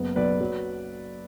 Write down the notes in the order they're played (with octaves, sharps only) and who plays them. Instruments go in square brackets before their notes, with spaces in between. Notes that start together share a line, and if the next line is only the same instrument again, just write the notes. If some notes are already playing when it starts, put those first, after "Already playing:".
Already playing: [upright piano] F#1 B3
[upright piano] B1 [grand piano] B4 D5
[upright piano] F#3